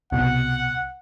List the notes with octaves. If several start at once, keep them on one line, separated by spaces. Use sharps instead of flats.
C2 B2 F#5